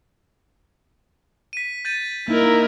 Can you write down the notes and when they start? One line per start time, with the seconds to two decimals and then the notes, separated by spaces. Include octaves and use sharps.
1.53 B6 D#7
1.85 G6 A6 D#7
2.28 A#3 D#4 E4 A#4